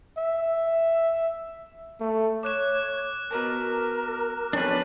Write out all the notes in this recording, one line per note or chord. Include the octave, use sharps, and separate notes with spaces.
E5
A3
C#5 D6 F#6 E7
B2 A#4 B4 A5
B1 F2 C#4 D4 B4